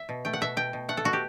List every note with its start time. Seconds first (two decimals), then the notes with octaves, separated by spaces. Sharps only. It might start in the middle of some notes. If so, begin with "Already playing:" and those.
Already playing: E5
0.09 B2
0.25 A3 G5
0.33 F#5
0.41 B2 E5
0.57 B2 G5
0.73 B2
0.89 A3 F#5
0.97 A4
1.04 B2 F#4
1.13 G4